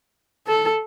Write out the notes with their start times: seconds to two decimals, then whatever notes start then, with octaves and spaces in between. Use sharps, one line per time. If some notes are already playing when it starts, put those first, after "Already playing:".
0.47 A4